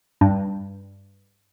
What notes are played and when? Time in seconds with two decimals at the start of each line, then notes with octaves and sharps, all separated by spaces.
0.21 G2